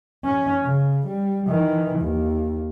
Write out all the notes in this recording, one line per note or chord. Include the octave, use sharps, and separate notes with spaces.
C#4
C#3
G3
D#3 E3
D#2